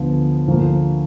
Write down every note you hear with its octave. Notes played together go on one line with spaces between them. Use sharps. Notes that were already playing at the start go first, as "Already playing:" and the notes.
Already playing: D2 D3 F3 B3
D2 D3 F3 A#3